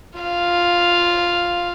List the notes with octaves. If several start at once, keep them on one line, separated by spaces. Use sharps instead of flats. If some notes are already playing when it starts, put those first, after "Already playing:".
F4 F5